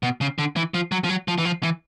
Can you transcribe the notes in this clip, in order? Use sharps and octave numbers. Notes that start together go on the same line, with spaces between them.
B2
C#3
D3
E3
F3
F#3
F3
F#3
F3
E3
F3
E3